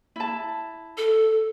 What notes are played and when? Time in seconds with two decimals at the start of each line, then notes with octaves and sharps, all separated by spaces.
0.16 E4 A5
0.97 A4